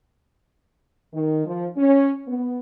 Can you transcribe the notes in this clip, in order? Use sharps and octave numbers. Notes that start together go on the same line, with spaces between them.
D#3
F3
C#4
B3